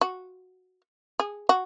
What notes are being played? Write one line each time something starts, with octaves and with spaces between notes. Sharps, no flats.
F#4
G#4
F#4